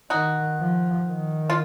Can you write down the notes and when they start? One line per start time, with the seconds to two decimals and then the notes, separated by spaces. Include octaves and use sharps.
0.10 D#3 D#4 F#4
0.60 F3
1.08 D#3
1.50 F4